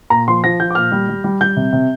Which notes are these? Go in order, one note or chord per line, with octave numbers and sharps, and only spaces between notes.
A#2 A#5
F3 C6
F3 A#6
F3 G6
D6
A#2 F6
G3
G3
G3
G3 G6
C3
C3